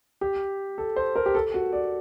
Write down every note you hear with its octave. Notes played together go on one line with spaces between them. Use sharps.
G4
A4
C5
A#4
G4
A4
F#4
D5